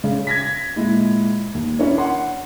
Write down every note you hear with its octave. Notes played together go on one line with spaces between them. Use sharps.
C#3
G#6 A#6 B6
A#2 G#3 E4
D#2
C#4 D4 E4 A#4 C#5
F#5 C6